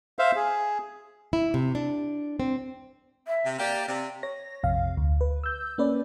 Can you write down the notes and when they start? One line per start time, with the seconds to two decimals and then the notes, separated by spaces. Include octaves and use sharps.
0.19 C5 E5 F5
0.36 G#4
1.33 E4
1.54 C3
1.75 D4
2.40 C4
3.27 E5
3.45 C3
3.59 A#3 G4 D5
3.87 C3 D5
4.23 C#5 A#6
4.63 A#1 F2 C3 F5
4.97 D2
5.21 B4
5.44 E6 G6
5.78 A#3 C#4 B4 D5